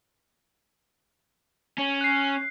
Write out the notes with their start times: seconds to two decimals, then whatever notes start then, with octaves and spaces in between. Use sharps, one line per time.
1.78 C#4
2.01 F#6 C7